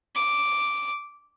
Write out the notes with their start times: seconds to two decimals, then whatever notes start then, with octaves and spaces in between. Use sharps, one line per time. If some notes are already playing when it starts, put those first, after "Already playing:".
0.15 D6